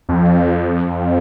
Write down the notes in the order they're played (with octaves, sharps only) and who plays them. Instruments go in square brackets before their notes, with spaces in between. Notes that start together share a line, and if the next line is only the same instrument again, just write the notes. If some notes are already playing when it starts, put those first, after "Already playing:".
[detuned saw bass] F2